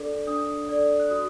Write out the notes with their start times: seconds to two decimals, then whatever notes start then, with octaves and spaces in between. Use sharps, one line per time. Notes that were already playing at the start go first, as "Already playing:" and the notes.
Already playing: D4 A4 D5 D6
0.27 D4 D#6
0.69 A4 D5
0.99 F#6
1.10 F#4 D#6